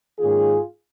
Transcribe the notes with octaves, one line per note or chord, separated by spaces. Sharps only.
G#2 D#3 A#3 C#4 F4 G#4